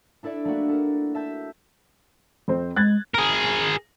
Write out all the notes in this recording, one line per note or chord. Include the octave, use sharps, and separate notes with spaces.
D4 E4 A4 D5 E5
A3 A#3 D4 F#4
A4 A#4
E5 A5 G6
F2 C4 C5
G#3 F#6 G#6 A6
G#4 A#4